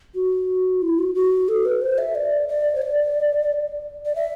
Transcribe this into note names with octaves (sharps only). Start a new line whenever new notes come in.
F#4
E4
F#4
F#4
A4
B4
C5
E5
D5
D5
C5
D5
D5
E5